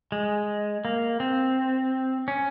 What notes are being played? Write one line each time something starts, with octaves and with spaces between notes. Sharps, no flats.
G#3
A#3
C4
C#4